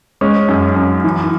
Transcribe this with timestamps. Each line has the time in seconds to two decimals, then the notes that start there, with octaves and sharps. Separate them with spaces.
0.21 G#3 C#4
0.48 F#2
0.76 F#2
1.04 E3